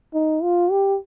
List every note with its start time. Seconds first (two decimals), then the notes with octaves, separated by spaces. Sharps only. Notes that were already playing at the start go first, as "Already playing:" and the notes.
0.14 D#4
0.43 F4
0.71 G4